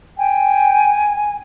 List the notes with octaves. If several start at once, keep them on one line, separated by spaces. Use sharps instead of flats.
G5 G#5